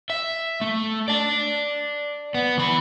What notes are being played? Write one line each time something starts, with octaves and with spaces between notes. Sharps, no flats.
E5
A3
D5 A5
B3
E3 B5